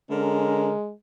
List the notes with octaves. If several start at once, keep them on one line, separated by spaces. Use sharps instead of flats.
D3 G#3 C#4 A#4